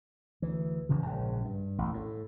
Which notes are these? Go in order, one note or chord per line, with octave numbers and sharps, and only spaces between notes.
D2 E3
F1 C#3 E3 F3
A#1 G#2 C#3
G2
A1 E2
A2